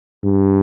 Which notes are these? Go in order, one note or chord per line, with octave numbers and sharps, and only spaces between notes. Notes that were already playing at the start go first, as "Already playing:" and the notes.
G2